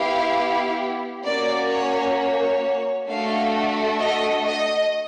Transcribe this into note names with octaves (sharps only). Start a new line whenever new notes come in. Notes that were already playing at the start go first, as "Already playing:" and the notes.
Already playing: B3 E4 G4 F5
A#3 C#4 F#4 D5
C#5
C#5
A3 D4 F#4 A4 F5
D#5
D#5